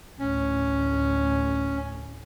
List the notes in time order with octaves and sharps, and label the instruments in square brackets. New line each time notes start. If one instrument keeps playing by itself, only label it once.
[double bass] A1 D2 [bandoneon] C#4